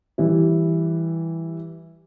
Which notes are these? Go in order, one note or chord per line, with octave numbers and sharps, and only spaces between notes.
E3 G3 E4